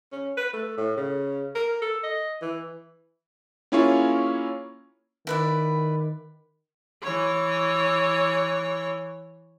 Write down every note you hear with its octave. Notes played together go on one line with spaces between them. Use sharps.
C#4
B4
A3
A2
C#3
A#4
A4
D#5
E3
A#3 C#4 E4 F4 G#4 C#5
D#3 E4 B4 D5
E3 C#5